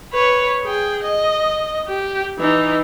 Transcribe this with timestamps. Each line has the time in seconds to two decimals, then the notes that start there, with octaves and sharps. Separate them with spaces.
0.13 B4 C#5
0.64 G#4 G5
1.03 D#5
1.87 G4
2.39 E3 D#4